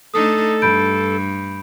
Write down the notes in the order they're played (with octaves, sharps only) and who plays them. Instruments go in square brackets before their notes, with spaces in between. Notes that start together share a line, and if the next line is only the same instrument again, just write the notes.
[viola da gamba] A3 D4 D#4 [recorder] A4 [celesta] D#6
[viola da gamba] G2 [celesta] B5 G6 D7